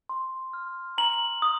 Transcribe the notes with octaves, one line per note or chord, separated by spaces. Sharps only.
C6
F6
A#5 F#7
D#6